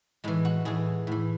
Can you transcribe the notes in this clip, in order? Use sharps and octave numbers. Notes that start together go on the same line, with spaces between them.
A2 E3 G#3
F#4
A2 E3 G#4
A2 E3